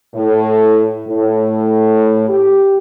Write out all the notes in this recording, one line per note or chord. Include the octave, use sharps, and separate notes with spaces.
A2
A2
G4